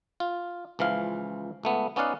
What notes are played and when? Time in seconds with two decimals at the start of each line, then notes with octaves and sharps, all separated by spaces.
0.20 F4
0.79 C#2 E3 F3 F5
1.63 C#2 A3 B3
1.96 B3 C#4 D#4 D5 F5 F#5